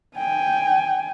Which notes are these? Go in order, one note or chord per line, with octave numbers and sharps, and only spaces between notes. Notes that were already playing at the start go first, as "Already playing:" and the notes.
G5 G#5